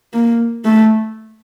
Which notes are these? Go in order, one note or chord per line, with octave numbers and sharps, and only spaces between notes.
A#3
A3